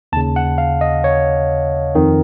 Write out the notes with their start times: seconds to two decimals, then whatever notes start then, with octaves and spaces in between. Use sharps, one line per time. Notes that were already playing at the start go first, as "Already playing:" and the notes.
0.13 D#2 A5
0.17 C#3
0.36 F#5
0.58 F5
0.81 D#5
1.04 C#5
1.95 F2 D#3